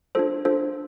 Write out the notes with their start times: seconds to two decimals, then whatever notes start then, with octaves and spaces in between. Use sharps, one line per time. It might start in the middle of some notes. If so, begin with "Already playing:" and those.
0.15 D4 F4 A4 C5
0.45 D4 F4 A4 C5